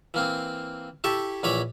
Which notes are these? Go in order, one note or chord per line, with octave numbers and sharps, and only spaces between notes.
E3 A#3 C4
E4 G4 A4 A5 C#6
A#1 E3 C#5 B5 D6